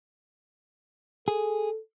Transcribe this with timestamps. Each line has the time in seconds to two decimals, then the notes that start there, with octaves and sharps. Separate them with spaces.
1.28 G#4 A4